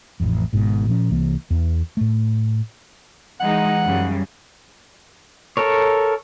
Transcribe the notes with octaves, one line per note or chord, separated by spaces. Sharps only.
A1 F2
G#1 G#2 B2
A#2 F3 C#4
C2 E3 A#3
E2
A2 A3
E3 G#3 D#4 F#5
F#2 C#3 G3
A4 A#4 C#5